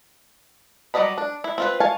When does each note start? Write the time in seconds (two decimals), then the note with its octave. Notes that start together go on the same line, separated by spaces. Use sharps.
0.94 F#3 G3 D5 D#5 B5
1.18 D4
1.44 E4
1.58 C4 F4 B4
1.80 C#5 F5 G#5 A5